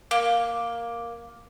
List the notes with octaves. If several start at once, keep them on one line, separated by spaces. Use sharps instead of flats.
A#3